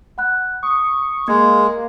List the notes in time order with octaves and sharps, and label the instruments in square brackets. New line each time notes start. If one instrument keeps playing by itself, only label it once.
[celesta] F#5 B5 F#6
[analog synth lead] C#6 [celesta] D#6
[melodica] G#3 [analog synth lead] A#3 [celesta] G#6